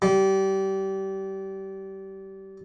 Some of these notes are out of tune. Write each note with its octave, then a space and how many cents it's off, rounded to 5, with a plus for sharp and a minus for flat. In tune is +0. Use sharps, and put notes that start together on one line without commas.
G3 -25